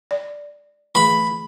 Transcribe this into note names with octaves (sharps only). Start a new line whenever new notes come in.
D5
E3 A3 G#4 B5